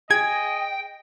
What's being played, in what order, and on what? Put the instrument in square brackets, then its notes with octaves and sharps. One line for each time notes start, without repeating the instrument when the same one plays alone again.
[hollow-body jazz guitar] G#4 [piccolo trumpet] D#5 [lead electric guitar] G5 [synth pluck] G#6